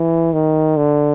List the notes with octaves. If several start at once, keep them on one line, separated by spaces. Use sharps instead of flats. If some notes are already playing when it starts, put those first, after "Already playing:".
Already playing: E3
D#3
D3